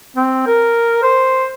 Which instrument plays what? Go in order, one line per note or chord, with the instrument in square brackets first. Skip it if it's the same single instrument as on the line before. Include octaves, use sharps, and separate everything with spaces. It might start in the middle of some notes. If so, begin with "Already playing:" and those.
[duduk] C4
A#4
C5